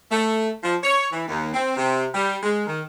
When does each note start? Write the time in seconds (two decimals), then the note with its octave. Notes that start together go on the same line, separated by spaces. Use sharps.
0.11 A3
0.63 F3
0.84 C#5
1.12 E3
1.28 D#2
1.54 C4
1.77 C3
2.14 G3
2.43 G#3
2.67 D#3